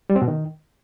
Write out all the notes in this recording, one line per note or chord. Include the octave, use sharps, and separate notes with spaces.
G3
C4
B2
D#3